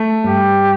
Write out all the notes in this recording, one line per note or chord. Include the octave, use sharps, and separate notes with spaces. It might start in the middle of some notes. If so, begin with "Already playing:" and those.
Already playing: A3
G2 G4